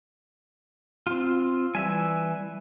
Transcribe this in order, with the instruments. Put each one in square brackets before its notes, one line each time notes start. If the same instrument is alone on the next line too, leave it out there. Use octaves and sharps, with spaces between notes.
[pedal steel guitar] C4 F4
[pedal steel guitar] E3 E5 G#5 [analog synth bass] G3